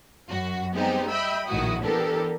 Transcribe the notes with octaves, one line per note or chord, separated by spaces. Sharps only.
F#2 F#4
G3 G#3 B3 C4 D#4 G4
D#5 E5 G5 B5 E6
A#1 A2 D#3 E4 F#4 D#6
E3 B3 D4 G4 A4 A#4